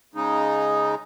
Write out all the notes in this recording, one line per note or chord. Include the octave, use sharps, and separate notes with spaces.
C#3 G#3 D#4